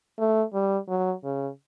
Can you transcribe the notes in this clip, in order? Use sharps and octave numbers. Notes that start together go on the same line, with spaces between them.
A3
G3
F#3
C#3